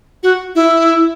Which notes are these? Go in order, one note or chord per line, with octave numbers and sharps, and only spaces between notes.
F#4
E4